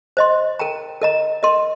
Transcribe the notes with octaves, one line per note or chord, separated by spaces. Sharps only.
C5 D#5 C6
A#4 G5 A#5
A#4 D#5 A#5
A#4 D#5 C6